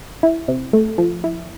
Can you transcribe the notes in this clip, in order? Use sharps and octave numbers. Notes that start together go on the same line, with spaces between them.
E4
C3
A3
F3
E4